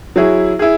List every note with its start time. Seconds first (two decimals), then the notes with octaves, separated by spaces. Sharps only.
0.16 F#3 E4 G#4
0.59 E4 G#4